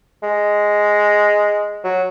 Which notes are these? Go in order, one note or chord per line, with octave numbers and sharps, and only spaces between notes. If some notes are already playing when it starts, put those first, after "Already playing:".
G#3
F#3